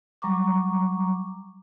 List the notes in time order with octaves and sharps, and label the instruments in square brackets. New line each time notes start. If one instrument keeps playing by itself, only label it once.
[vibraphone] F#3 G3 A#5 C#6 D6